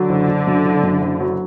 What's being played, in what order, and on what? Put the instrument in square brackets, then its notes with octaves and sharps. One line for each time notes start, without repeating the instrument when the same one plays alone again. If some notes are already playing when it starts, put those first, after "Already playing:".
Already playing: [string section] D3 [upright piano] F#3
[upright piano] F#1
F#1
F#2
F#1
F#2
F#1
F#3